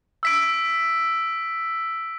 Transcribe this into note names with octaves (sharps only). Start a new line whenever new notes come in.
E6 B6 D7